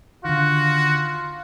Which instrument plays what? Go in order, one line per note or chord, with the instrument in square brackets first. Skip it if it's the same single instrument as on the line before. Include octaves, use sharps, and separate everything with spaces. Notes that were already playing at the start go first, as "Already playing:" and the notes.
[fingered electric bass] D3 D#3 [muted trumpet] F4 [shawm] F#4